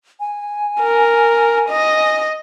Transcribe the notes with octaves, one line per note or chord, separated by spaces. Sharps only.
G#5
A#4
D#5